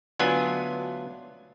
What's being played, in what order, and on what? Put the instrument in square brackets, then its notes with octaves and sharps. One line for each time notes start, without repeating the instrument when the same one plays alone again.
[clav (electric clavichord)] D2 F#3 B3 D4 F4 G#5